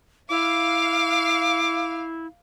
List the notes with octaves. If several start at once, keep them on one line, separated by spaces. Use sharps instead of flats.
E4 F5 D6